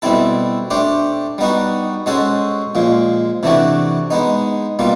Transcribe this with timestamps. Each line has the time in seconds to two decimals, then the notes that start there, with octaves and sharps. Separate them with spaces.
0.02 B2 G3 C4 E4 A4
0.70 A3 D4 G4 C5
1.38 G3 B3 D#4 F#4
2.06 G#3 C#4 F#4 A4 C5
2.75 A#2 F3 G#3
3.43 C3 E3 A3 D4 F#4
4.11 G#3 B3 D#4
4.79 B2 G3 A#3 F4